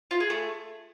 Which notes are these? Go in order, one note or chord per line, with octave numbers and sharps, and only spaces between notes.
F4
G#4
A3